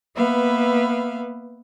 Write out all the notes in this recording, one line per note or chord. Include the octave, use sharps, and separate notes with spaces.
A#3 B3 B4 E5 F5